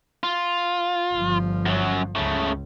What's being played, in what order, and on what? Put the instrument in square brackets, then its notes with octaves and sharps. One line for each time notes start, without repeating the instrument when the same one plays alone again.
[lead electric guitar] F4
[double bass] G1 F3
[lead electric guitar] F#2 F#3
[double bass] C#2 [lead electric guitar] C#3 A3